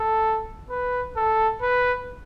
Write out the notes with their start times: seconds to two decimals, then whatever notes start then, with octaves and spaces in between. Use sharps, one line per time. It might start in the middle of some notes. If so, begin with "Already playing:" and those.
Already playing: A4
0.70 B4
1.16 A4
1.62 B4